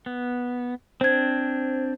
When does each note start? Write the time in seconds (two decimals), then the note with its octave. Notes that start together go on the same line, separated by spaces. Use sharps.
0.06 B3
1.01 C4 D4 C5 G#6